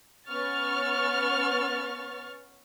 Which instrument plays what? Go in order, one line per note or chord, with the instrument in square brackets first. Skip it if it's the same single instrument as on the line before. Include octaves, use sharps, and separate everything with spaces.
[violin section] B3 C#4 C#6 F6 A6